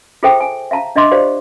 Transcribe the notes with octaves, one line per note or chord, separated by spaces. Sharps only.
F4 G#4 A4 C5 E5 G5
G#5
E5 F5 A5 A#5
D4 D#5 E5 C6 D6
F4 G4 C5 D5 F5